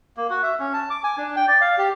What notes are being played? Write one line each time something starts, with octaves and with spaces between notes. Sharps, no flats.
A#3
F#4
E5
C#4
A5
D6
G#5
D4
G5
D5
F5
G4